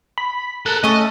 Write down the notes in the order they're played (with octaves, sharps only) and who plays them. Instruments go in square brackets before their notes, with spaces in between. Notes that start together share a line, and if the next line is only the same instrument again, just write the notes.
[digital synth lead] B5
[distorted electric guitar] A4 A#4 [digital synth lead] F#6
[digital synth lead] A3 [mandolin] C#4 A4 [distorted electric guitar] D#5